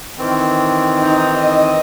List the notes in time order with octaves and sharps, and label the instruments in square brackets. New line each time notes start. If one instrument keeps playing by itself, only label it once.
[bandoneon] D#3 E3 C4
[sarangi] D#4
D#5